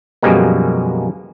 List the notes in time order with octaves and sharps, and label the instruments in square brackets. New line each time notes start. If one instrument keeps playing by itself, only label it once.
[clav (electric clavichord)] F#2 B2 F3 G3 G#3 A#3